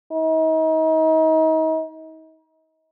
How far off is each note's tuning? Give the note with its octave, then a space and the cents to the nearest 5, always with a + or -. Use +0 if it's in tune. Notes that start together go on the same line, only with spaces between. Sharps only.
D#4 +35